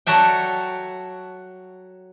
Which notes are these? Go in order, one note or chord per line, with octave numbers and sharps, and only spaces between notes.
F#3 F#4 A4 E5 G5